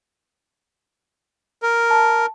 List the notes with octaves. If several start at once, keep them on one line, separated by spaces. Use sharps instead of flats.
A#4
A5